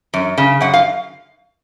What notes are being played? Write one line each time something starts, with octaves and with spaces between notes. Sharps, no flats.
F#2
C#3
F#2 F#5
F5